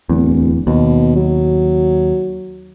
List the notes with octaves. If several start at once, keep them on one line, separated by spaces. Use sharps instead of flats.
D1 E2
D#2 B2
F#3